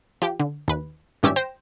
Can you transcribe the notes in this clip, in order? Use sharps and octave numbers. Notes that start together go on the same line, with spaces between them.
F3 G4
D3
D#2 B4
G#1 G2 C#4 G4 D5 E5
C5 G5 A#6 E7